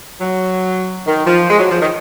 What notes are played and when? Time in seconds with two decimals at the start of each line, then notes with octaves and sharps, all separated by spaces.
0.20 F#3
1.06 D#3
1.26 F3
1.49 G#3
1.58 F#3
1.70 F3
1.81 D#3